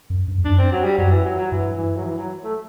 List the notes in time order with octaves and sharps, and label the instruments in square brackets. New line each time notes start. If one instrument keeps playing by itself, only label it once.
[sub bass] F#2
G2
E2
[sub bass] F#2 [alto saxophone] D4
[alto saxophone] C4
F#3
G3
[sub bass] F#2 [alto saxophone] F#3
[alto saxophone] E3
F#3
F#3
[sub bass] G2 [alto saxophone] E3
[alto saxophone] E3
F#3
E3
F#3
A3